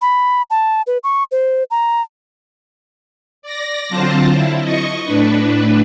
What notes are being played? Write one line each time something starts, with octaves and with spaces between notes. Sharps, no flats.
B5
A5
B4
C#6
C5
A#5
D5 A#6
D3 F#3 C4 F4 C5 A5
E4
D#5 C#6
A2 D4 B4